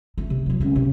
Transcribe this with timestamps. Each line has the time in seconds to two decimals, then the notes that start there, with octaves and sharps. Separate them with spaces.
0.18 A3
0.30 C3
0.46 F2 F#3
0.60 C#2 C4
0.76 C3